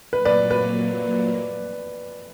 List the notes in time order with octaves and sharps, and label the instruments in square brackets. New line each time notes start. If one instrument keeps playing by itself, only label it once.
[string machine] A#2 F#3 A#3 [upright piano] B4
[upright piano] B4 D5
B4